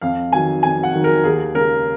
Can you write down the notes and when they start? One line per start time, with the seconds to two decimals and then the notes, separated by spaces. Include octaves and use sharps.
0.01 F2 F5
0.32 D#3 F#3 G#5
0.63 F2 G#5
0.83 F#5
0.93 D#3 F#3
1.04 A#4
1.24 D#2 G#4
1.54 C#3 G#3 A#4